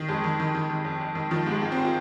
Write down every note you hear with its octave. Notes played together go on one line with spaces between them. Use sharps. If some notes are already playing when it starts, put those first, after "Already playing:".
Already playing: D#3
F2 G#3
D#3
D#3
D#3
D#3
F2
F2
D#3
D#3 F3
G#2
G#3
G#2
C4
F4